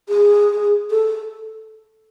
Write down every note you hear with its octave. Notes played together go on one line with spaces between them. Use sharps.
G#4
A4